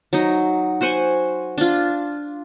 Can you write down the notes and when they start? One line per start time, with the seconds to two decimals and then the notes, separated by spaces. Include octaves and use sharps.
0.13 F#3 D#4
0.81 F#4 C5 F#5 G#5
1.58 D4 F4